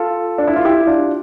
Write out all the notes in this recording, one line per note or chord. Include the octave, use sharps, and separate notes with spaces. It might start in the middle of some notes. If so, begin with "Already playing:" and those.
Already playing: F4 A4
D4
E4
F4
E4 G4
D4 F4